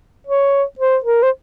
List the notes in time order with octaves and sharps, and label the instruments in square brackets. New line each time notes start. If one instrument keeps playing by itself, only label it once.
[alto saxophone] C#5
C5
A#4
C5